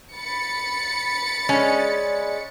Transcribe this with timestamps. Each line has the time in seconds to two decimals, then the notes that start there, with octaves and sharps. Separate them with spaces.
0.15 B5 A6 C#7
1.49 G#3 C#4 D5